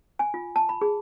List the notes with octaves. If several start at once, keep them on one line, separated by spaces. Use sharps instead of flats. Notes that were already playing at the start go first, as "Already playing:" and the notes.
G#5
F4
A5
B5
G#4